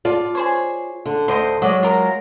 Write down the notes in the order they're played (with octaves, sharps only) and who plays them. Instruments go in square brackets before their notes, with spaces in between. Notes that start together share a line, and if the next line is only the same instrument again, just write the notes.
[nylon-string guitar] F4 D5 [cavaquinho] A5
[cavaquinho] G#4 C5 C#5
[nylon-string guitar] D3
[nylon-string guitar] D2 [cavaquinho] C5 D#5 C6
[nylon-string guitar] F#3 G#3 [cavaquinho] D5 D#5
[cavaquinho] F4 A#4 A#5